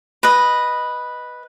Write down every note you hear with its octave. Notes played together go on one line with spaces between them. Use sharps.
B4 D#5